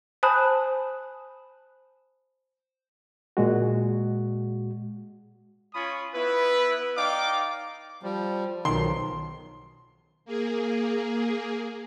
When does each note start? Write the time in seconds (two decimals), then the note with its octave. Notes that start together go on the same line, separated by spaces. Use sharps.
0.23 C5 G#5 A5 B5 D#6 F#6
3.37 A#2 G#3 F#4
5.74 C#4 F4 G#5 B5 C#6 D#6
6.14 B3 E4 B4
6.97 D#4 D5 D#5 F5 G5 D6
8.03 F3 G3
8.65 B1 D#3 F3 C6
10.25 A#3 G#4